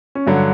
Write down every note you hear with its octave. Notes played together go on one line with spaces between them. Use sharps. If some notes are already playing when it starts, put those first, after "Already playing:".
C#4
G2 D3 F#3 D4